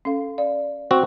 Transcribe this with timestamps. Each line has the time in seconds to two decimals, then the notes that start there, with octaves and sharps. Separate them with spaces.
0.05 C#4 A4 F5
0.38 D5 F5
0.91 C4 F#4